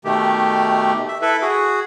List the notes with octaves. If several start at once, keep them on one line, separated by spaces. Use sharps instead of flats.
B2 D#3 A3 G4
E5
E4 A4 B4 E5
F#4 G#4